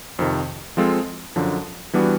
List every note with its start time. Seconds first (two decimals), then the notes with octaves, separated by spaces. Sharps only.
0.19 F2 C3 D#3
0.77 F3 G#3 C4 F4 A4
1.36 F#2 D3 F3
1.93 E3 G3 B3 D4 F#4